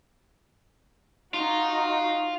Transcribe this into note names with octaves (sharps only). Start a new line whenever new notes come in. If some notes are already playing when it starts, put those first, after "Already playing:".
D#4 F4 F#4